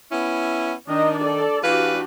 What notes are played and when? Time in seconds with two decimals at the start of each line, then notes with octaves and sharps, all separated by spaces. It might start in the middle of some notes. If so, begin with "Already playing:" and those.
0.12 B3 C#4 E4
0.89 D#3 D4 D#4 D#5
1.19 A4 D5
1.64 E3 D4 F#4 G4 B4 F5